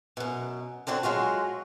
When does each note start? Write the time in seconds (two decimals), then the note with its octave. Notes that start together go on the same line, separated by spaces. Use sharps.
0.17 F#2 B2
0.87 D3 C4 D4 F#4
1.03 F#3 G#3 F4 F#4